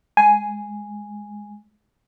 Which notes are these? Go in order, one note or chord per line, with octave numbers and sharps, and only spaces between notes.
G#3 G#5